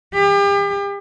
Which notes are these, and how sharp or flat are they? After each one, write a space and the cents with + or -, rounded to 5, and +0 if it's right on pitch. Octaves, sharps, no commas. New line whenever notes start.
G4 +40